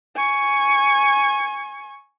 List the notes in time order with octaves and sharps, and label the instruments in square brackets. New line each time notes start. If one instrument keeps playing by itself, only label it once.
[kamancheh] G#5 C#6